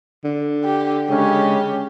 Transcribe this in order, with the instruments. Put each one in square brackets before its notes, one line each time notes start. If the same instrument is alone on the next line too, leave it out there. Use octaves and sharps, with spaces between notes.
[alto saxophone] D3
[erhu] G4
[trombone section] C#3 G#3 C#4 [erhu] G4